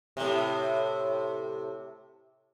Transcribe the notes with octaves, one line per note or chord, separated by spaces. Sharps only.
A2 C3